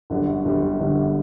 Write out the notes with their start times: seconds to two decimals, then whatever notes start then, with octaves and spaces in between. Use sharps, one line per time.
0.10 G1 F#2 D3 G3
0.45 G1 F#2 D3 G3
0.80 G1 F#2 D3 G3